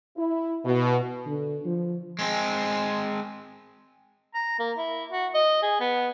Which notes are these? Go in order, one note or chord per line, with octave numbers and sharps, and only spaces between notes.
E4
B2
D3
F3
G#3 C4
A#5
A#3
E4
F#4
D#5
G#4
B3